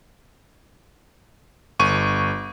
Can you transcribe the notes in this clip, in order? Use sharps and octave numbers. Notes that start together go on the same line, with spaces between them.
G1 C#6 D#7